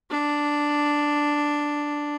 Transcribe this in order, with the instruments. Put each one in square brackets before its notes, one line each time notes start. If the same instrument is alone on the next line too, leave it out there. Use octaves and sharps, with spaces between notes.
[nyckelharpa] D4